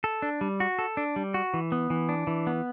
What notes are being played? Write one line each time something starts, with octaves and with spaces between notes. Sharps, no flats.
A4
D4
G3
F#4
A4
D4
G3
F#4
E3
B3
E3
D4
E3
B3